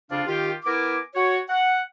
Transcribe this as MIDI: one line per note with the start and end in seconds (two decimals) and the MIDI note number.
0.10 0.22 41
0.10 0.22 49
0.10 0.22 62
0.10 0.22 65
0.10 0.22 74
0.10 0.22 77
0.27 0.52 51
0.27 0.52 65
0.27 0.52 67
0.65 0.98 59
0.65 0.98 64
0.65 0.98 70
0.65 0.98 80
0.65 0.98 86
1.14 1.38 66
1.14 1.38 73
1.49 1.79 78